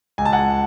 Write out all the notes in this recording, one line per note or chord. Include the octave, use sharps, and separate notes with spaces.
C#2 G#5
A5
F#5 G#5
C#2